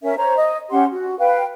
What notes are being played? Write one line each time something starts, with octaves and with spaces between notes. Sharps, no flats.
C#4 A#4 E5
C5 C#5 A#5
D#5
C#4 G4 F#5 C6
F#4
B4 F5 G5